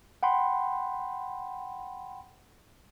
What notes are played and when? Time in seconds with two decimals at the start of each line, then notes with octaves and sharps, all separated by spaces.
0.23 F#5 G5 B5 C6